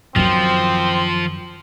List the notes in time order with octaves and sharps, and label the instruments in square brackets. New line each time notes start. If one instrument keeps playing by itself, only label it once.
[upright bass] F#2 D#3 [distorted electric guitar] F3 [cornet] C4